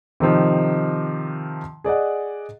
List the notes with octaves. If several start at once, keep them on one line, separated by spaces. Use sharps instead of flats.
C3 D#3 F3 D#4
G#4 D5 D#5 F#5